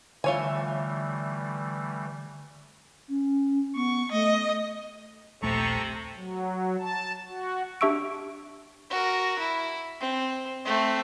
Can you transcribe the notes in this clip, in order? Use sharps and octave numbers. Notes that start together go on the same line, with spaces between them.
D3 E3 G3 A3 F4 C#5 E5 G#5
C#4
B3 C#6
A3 D#5
D#1 A#1 C3 A3 A4 A#5 C#6
F#3
A5
F#4
D4 G4 E5 C#6 E6 D7
F#4 A#4
E4
C4
A3 C4